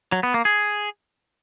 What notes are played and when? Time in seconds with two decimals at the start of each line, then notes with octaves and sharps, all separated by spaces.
0.12 F#3
0.23 B3
0.34 A#3
0.45 G#4